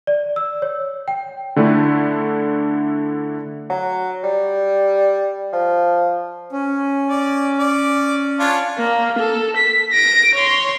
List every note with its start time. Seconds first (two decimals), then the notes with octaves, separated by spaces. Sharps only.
0.07 D5
0.36 E6
0.62 C#5
1.08 G5
1.56 D3 A3 D4 E4
3.70 F#3
4.23 G3
5.53 F3
6.52 C#4
7.09 D5
7.59 D5
8.40 D4 F4 C#5
8.78 A#3
9.19 A4
9.57 B6
9.93 A#6 D7
10.35 C#5 C6